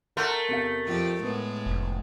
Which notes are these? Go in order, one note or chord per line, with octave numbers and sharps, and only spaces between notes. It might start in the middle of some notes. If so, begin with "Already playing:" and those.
A3 A#4 F#5 C6 F#6
E2 C3 F5
F2 G4
A2 G#3 B3
F1